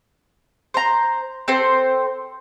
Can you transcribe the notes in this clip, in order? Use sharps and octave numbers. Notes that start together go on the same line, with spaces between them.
C5 A#5
C4 A4 C5